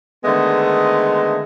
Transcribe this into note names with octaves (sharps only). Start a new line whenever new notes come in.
D3 D#3 G#3 A3 B3